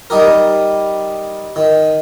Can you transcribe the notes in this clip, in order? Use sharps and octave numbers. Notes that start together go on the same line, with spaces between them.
G3 D#4 G4 A#4
D#3